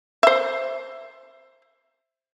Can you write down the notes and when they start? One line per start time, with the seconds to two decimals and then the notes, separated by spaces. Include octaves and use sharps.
0.23 C5 E5